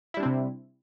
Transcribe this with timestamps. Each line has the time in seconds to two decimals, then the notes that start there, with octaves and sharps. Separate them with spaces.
0.14 E4
0.17 G3
0.20 D4
0.23 C4
0.26 C3